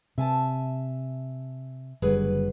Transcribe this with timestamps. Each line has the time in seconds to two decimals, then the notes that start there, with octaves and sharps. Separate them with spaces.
0.18 C3 E5 G#5 A5
2.02 F#1 D3 F#3 G3 G#4 B4